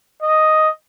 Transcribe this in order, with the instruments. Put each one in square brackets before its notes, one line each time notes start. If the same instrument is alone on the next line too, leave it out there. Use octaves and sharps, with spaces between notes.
[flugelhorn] D#5